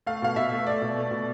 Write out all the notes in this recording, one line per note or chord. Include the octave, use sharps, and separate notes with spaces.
A3 F5
B2 F5
B2 E5
A3
A3 D5
B2
A3
B2